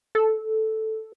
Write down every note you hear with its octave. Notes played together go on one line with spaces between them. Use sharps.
A4